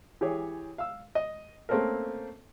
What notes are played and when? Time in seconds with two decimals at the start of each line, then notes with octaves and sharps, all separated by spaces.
0.21 E3 G4 G#4 C#5
0.78 F5 E6
1.15 D#5
1.69 A3 A#3 C4 C#4 A4 A#4